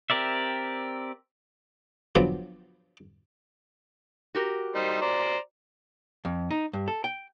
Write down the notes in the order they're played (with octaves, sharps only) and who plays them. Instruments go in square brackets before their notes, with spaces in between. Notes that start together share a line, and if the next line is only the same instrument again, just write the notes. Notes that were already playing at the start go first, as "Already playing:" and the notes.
[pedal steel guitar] C4 G4 A#4 D5 E5
[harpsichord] G2 F3 F#3 B3 C4 G4
[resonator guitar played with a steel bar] F#4 G4 A#4
[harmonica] G3 D#4 C5
C5 D5 A#5
[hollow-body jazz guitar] F2
D#4
G2
A4
G5